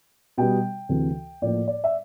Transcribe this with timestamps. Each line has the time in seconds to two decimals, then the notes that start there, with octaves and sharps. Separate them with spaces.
0.38 B2 G3 B3 G5
0.89 D2 C3 E3
1.42 A2 F3 A#3 D5
1.68 D5
1.84 E5